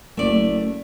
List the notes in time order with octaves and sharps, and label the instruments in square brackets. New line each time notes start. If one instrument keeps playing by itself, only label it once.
[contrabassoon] F#1 [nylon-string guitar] A3 D5